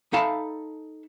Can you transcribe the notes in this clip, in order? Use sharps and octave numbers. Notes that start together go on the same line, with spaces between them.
D#4 A4 E5 F5 A5 B5